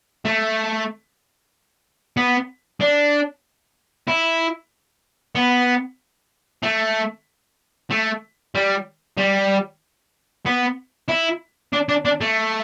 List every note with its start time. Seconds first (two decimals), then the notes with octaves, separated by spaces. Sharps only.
0.25 A3
2.17 B3
2.80 D4
4.08 E4
5.35 B3
6.63 A3
7.90 A3
8.55 G3
9.18 G3
10.46 B3
11.09 E4
11.73 D4
11.89 D4
12.05 D4
12.21 A3